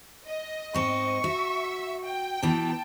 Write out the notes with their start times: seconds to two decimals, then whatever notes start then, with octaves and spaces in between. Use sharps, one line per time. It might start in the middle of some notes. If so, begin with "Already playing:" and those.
0.26 D#5
0.74 G#2 C4 C#6
1.24 F#4 E5
2.04 G5
2.43 B2 E3 A5